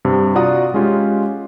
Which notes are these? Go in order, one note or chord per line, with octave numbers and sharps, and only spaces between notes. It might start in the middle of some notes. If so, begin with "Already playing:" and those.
G2 C3
F4 F#4 D5 F#5 A#5 D#6
G#3 C#4 F4 G4